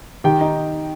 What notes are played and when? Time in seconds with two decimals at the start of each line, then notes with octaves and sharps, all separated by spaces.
0.24 D#3 G4 G5
0.41 D#4